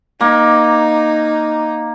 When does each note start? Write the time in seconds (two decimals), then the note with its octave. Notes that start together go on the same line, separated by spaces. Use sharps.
0.21 A#3 D#4